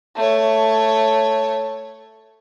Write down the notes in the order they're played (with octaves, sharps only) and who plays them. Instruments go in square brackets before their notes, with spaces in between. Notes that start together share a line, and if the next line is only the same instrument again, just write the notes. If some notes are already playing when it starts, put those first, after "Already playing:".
[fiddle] A3 C#5